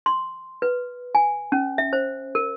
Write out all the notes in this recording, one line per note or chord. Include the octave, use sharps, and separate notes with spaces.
C6
B4
G#5
C#4
E5
C5
A#4